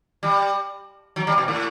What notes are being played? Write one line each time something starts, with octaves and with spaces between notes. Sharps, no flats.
G3
F#3
G3
B2
A2